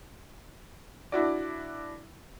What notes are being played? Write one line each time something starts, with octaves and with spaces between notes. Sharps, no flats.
D4 E4 F#4 D5